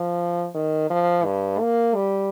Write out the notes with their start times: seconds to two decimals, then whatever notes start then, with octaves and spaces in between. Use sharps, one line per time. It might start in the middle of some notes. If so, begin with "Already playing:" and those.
Already playing: F3
0.55 D#3
0.90 F3
1.25 G2
1.60 A#3
1.95 G3